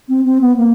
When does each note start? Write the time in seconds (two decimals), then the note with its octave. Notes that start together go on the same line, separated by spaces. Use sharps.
0.09 C4
0.25 C4
0.41 B3
0.57 A#3